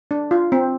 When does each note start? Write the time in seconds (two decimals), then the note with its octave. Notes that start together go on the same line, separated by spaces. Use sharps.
0.11 D4
0.31 F4
0.52 C4